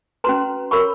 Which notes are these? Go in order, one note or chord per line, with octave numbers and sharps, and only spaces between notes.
C#4 F#4 B4 A#5 C6
F#4 A#4 C#5 B5 C#6